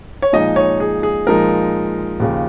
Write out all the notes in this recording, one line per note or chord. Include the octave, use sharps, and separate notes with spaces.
C#5
A#2 F3 G#3 D#4 D#5
C#5
G#4
G#4
A#2 F3 G#3 D#4 A#4
D#2 C#3 F3